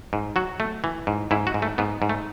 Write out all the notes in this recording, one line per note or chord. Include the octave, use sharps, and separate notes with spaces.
G#2
F#3 F#4
A3
E3
G#2
G#2 E4
F#4
G#2
A3
G#2 B3
G#2
A3